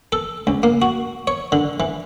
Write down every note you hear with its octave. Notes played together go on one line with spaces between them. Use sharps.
A4
C#2
A#3
F#4
C#5
D3
E3